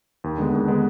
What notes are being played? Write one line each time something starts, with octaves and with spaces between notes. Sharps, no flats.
D#2
D3 G#3 B3
D#2
D3 G#3 B3